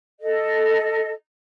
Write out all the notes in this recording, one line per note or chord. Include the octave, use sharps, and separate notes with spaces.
A4 D#5